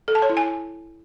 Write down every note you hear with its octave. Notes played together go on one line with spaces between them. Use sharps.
A4
A5
C#5
E4
G#5